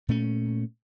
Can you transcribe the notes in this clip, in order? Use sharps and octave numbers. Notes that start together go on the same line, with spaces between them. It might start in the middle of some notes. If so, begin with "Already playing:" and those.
A#2 A3 C#4